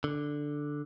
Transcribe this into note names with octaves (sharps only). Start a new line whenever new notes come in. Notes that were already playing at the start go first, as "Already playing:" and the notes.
D3